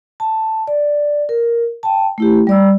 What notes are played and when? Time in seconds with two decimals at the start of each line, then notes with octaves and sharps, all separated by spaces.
0.20 A5
0.67 D5
1.29 A#4
1.83 G5 A5
2.18 A3 E4 G4
2.47 G3 D5 E6